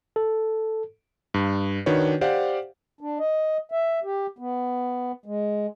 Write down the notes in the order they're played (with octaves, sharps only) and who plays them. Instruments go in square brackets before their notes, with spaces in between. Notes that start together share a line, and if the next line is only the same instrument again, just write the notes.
[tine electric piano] A4
[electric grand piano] G2
D#3 D4 F#4 B4 C#5
G4 C5 D5 F5 F#5
[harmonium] D4
D#5
E5
G4
B3
G#3